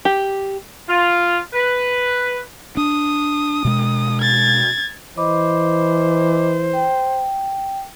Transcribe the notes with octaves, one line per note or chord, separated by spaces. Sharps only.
G4
F4
B4
D4 D#6
B2 G#3
G#6 A6
E3 C5 D#5 B5 D6
G5